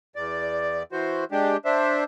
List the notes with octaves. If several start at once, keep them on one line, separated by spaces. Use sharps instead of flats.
E2 D5
E3 F#4 C5
G#3 D4 G4
D4 C5 E5